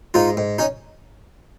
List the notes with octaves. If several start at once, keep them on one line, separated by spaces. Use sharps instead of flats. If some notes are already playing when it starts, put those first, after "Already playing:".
G#2 D#4 F4
G#2
C#4 D#4